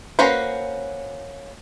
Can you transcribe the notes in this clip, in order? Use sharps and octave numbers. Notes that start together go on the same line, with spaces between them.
A#3 C#4 F#4 B4 C5